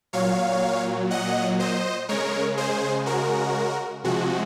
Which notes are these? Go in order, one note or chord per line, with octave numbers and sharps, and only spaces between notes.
A#2 F#3 C#5 F5
D#5 F#5
C5 D#5
C#3 G#3 A#4 C#5
G#4 C5
F#4 A#4
C3 F3 G#3 F#4